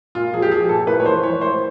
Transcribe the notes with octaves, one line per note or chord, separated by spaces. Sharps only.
A#2 F4
F3 G#4
G4
F3 G#4
A#2 A4
A2 B4
C#5
E3 C5
E3 C#5
A2 C5